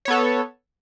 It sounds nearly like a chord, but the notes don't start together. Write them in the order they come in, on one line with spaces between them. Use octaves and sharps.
C#5 B3 A4